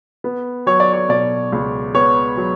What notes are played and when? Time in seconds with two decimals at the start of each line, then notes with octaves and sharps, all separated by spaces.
0.24 B3
0.66 F#3 C#5
0.80 D5
0.93 C#5
1.09 B2 D5
1.53 C#2
1.94 B3 C#5
2.37 F#3